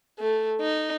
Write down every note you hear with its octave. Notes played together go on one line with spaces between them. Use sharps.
A3
D#4